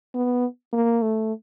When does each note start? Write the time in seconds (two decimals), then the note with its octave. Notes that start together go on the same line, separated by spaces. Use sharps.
0.15 B3
0.73 A#3
1.02 A3